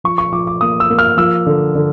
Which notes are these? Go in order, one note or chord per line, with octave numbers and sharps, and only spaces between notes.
F3 C#6
C#6
F3 D6
D6
A#3 D#6
E6
A#3
F6
F3 E6
D3
D3